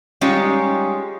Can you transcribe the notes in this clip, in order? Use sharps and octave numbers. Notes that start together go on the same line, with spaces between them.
G3 G#3 C#4 D#4 F4 G4